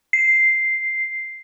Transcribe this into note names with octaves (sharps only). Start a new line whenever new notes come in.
C7